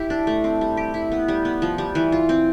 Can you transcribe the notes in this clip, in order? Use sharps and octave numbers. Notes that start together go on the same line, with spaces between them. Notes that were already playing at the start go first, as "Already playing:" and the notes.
Already playing: E4 G4
D4
A3
C4
G3
G4
E4
B3
G3
B3
F3
G3
E3
F4
C4